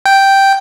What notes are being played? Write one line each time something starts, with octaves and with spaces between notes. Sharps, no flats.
G5